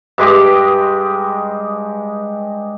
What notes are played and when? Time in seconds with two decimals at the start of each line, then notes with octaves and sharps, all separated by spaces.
0.18 G2 G#3 G4 D#5